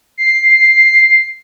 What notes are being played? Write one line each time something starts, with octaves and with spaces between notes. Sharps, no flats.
C7